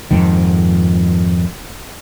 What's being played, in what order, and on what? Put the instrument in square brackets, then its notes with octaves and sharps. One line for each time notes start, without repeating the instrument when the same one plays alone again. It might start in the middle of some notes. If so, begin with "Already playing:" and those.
[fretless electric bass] F2 G#2 D#3